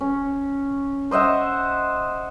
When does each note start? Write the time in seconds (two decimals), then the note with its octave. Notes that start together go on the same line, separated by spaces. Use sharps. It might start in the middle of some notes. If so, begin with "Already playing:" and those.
0.01 C#4
1.11 C5 D#5 E5 F#5